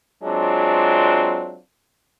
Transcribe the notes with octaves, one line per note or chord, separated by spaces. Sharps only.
F#3 G#3 C4 D4 F4